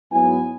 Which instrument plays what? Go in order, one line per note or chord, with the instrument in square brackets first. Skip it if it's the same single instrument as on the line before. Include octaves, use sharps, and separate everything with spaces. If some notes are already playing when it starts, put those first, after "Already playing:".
[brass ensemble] G#2 F#3 B3 E4 G#5